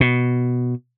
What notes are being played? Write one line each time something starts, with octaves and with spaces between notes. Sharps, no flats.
B2